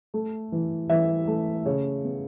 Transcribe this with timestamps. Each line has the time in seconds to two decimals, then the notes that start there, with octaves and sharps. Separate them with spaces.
0.14 A3
0.52 E3
0.90 E3 E5
1.27 A3
1.66 C#3 C#5
2.04 B3